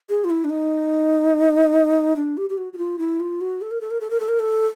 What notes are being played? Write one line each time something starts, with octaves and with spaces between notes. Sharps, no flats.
G#4
F4
E4
D4
D#4
D4
G4
G4
F#4
F#4
F4
E4
F4
F#4
A4
A#4
A4
A#4
A4
A#4
A4
A#4
A4